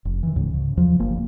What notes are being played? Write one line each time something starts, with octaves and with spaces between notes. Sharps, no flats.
F1
D#3 E3
C#2 G#2 C#3
C#3
E2 F3 F#3
G1 A#3